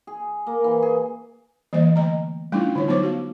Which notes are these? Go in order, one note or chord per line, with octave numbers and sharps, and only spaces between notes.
G#4
A#3
E3
G#4
E3 G3 A#3 C5 D#5
D3 A3 D#5 A#5
G3 A3 C#4 D4 E4 F4
D3 D#4 F4 C#5
F#3 B3 D#4 C5 C#5 D6
F#4 F5